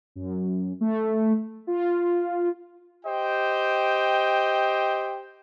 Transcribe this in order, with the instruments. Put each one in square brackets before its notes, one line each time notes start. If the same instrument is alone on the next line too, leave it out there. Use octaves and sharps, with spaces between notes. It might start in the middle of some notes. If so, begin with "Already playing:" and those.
[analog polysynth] F#2
A3
F4
[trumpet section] G4 C5 D#5 G5